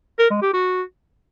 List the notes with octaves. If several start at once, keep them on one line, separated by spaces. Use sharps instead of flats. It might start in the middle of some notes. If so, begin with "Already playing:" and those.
A#4
G#3
G4
F#4